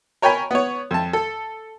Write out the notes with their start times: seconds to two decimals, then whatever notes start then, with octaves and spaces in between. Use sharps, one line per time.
0.22 A#4 C#5 G5 G#5 B5
0.51 B3 C#5
0.91 F2 A5
1.13 A4